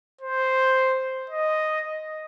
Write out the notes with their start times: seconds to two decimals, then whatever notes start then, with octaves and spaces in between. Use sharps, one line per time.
0.21 C5
1.30 D#5